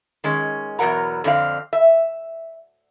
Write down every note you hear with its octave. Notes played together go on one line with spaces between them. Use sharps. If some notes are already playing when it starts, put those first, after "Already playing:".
D#3 G#3 C#4
E2 B2 F#3 A#4 F#5 A#5
F2 D3 C4 E4 F5
E5